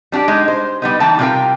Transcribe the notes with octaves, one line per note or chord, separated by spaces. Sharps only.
G3 D4 F#4 G4
G#3 D#4
C5
G3 B3 D#4
E3 D#4 G5 A5
C3 G3 F4 G#4 A#4 G5